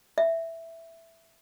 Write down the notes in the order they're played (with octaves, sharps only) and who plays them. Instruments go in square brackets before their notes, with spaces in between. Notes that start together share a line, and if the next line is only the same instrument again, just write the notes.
[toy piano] E5